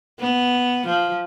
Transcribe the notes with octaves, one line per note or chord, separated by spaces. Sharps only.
B3
F3